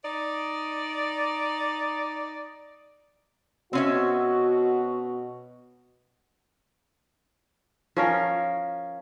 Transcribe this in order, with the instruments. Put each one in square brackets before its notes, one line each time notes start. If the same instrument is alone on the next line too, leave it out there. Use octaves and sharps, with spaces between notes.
[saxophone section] D#4 D5
[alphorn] B2 [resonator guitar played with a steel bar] C4 C#4 E5 [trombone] F#4
[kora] F3 C#4 A#4